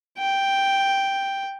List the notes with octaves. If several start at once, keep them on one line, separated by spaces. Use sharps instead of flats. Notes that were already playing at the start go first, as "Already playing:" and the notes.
G5